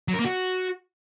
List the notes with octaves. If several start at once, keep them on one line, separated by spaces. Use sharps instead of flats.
F#3
A#4
A#3
F#4